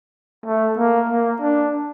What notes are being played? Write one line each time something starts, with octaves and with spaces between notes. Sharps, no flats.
A3
A#3
A#3
D4